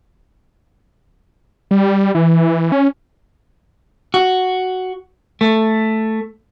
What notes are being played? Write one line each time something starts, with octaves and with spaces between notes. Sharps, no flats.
G3
E3
C#4
F#4
A3